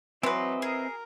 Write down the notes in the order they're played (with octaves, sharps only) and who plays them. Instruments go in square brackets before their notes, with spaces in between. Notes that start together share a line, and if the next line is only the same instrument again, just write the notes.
[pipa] E3 B4 [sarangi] F#3 [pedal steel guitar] C4 D#5 [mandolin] C6
[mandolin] G#4 [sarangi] A#4